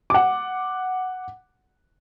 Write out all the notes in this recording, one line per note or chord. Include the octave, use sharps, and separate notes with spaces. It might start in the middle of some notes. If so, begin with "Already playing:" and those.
F#5 D6